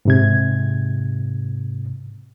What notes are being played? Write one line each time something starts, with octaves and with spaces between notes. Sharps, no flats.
G#2 C3 G#6